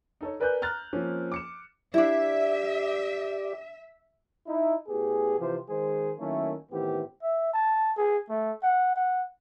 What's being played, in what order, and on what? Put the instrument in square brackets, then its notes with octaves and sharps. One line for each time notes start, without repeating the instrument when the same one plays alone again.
[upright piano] D#4 A4 C#5
A#4 B4 D5 G#5 F#6 G6
A#5 F6 F#6 A6
F3 A#3 C4 C#4
D6 C#7 E7
[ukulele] D4 E4 [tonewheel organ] G4 D5 [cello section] E5
[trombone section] D#4 E4
A2 B3 G4 G#4
C3 E3 F3 F4 G4 C5
D#3 G#3 G#4 C5
D#3 F#3 A3 A#3 C#4 E4
A2 D#3 E3 B3 C4 G4
[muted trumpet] E5
A5
G#4
A3
F#5
F#5